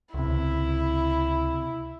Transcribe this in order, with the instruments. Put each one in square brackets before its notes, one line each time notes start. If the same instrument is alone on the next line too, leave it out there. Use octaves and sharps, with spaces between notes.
[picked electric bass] C#2 C3 [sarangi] E4